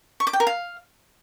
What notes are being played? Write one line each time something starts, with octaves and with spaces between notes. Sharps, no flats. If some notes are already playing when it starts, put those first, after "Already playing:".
C#6
D6
G5
A#4
F5